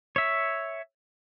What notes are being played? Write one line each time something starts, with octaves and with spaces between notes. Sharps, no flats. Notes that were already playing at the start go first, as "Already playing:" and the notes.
C#5 E5